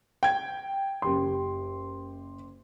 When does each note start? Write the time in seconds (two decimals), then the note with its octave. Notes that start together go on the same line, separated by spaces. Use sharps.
0.23 G5 G#6
1.02 F#1 G4 C6